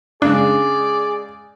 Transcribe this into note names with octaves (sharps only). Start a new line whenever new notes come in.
C#3 G#3 D4 G#4 D5